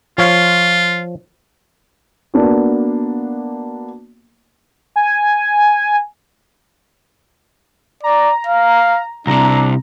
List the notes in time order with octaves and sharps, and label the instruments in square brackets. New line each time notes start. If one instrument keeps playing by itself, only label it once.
[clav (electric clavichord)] F3 C#5 F5 [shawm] F4
[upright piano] A#3 B3 D4 F#4
[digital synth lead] G#5
[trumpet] D5 [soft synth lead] A#5
[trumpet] F5
[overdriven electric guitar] C2 C3 [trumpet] D4 [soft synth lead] A#5